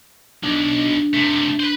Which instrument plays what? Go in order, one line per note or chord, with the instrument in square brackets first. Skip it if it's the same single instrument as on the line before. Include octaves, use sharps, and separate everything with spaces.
[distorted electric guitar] B1 [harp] D4
[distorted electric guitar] C3 A3
B4 C5